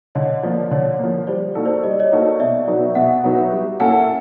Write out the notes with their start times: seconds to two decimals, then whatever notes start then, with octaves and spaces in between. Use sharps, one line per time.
0.15 D3 C#5 D#5
0.43 F3 A#3 C5 D5
0.71 D3 C#5
0.99 F3 A#3
1.27 G3 C5 D5
1.55 A#3 D#4 F#4 A4
1.65 C5 D5
1.83 G3 D#5
1.91 D5
1.99 C#5 D#5
2.12 A#3 D#4 F#4 A4
2.40 B2 D5 E5
2.67 F#3 B3 D#4 F#4
2.95 B2 E5 F#5
3.24 F#3 B3 D#4 F#4
3.52 G3
3.80 A#3 C#4 E4 A4 F#5 G#5